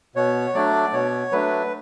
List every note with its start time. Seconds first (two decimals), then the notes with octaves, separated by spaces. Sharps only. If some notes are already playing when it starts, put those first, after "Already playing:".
0.16 B2 C#5
0.54 F#3 A3 D4 D5
0.92 B2 C#5
1.32 F#3 A3 D4 B4